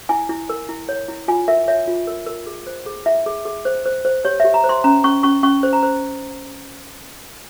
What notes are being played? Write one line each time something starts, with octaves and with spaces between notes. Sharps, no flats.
E4 G#5
E4
A#4
E4
C#5
E4
F4 G#5
A#4 E5
C#5 E5
F4
A#4
A#4
G#4
C5
G#4
E4 E5
G#4
G#4
C5
C5
C5
G4 C#5
G4 E5
A#5
C5
C6
C#4 A#5
C#4 C#6
C#4 C#6
C#4 C#6
C5
A#5
C5